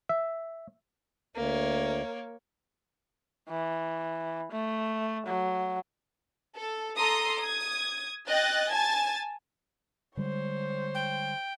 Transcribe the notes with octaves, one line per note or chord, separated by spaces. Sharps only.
E5
D2 A#3 C#5
E3
A3
F#3
A4
A4 A#5 C6 D#6
D#6 G#6
D#5 G5 F#6 A6
G#5 A5 G#6 A6
D3 G3 G#3 C5 C#5
G5